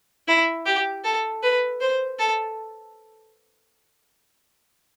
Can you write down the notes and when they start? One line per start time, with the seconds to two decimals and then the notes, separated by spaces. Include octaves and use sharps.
0.27 E4
0.66 G4
1.04 A4
1.43 B4
1.81 C5
2.19 A4